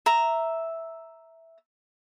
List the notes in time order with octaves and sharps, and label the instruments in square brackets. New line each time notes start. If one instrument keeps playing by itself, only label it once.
[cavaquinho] E5 A#5